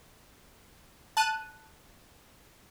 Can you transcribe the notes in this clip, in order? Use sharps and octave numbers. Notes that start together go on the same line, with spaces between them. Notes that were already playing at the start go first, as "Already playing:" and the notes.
A5 F#6 D#7